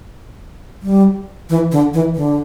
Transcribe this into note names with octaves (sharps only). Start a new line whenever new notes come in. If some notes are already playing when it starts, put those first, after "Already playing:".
G3
E3
D3
E3
D3